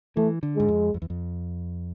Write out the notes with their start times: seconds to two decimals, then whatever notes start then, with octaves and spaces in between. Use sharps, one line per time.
0.16 E3 A3
0.43 D3
0.56 G#2 G#3
0.68 F2
0.94 F2
1.02 E2
1.10 F2